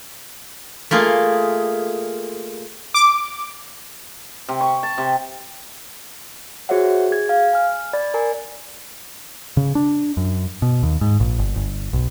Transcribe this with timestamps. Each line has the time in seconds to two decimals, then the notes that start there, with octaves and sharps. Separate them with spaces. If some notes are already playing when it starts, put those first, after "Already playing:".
0.91 A3 A#3 F4 G#4
2.94 D6
4.49 C3
4.61 C#6
4.83 A5
4.98 C3
6.69 F#4 G#4 C5 C#5 E5 F#5
7.11 G#4 G#6
7.29 F5
7.53 G#5 F6
7.93 D5 B5 A6
8.14 A#4 D5 G#5 A#5
9.57 C#3
9.75 D4
10.17 F#2
10.62 B2
10.83 D#2
11.01 G#2
11.20 A#1
11.39 G1
11.56 G1
11.93 B1